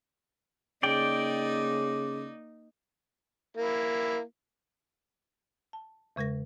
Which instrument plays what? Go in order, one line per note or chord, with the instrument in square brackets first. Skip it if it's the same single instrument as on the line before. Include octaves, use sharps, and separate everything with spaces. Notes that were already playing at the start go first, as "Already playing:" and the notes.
[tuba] C#3 [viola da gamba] A#3 D#4 [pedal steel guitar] D5 G5
[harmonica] A#3 E4
[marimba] A5
E2 C#3 G#3 A#4 A#6